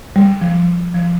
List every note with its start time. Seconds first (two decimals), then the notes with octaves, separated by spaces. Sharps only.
0.16 G3
0.41 F3
0.94 F3